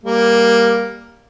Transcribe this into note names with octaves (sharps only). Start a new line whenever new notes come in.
G3 A#3